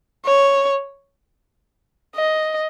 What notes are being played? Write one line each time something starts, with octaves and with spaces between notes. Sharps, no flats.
C#5
D#5